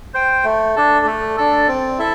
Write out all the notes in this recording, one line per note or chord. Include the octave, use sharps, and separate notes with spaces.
C5 G5
A3
D4 A4
A3
D4 A4
C4
E4 A4 E5